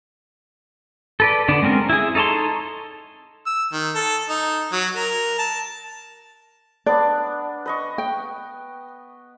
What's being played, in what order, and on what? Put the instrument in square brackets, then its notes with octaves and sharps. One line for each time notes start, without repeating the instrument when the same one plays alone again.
[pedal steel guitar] A4 B4 D5
D3 B3 D4 D5
G#3 C4 C#4 A#4
E4 G#4
D#4 A4 C#5 A5 C6
[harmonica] E6
D#3
A4
D#4
F#3
A#4
A5
[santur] B3 D4 [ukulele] D5
[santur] B4 D#5 C#6
[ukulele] G5